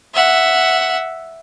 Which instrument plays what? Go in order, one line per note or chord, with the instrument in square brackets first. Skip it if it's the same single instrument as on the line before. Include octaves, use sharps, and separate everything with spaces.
[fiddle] E5 F#5